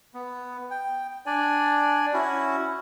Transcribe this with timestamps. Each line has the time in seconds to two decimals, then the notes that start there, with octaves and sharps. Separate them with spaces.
0.14 B3
0.71 G5
1.26 D4 D5 G#5
2.13 C#4 E4 F#4